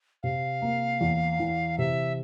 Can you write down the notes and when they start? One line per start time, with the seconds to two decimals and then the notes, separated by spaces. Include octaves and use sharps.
0.23 C3 F5
0.62 A#3
1.01 E2
1.39 E3
1.78 C3 E5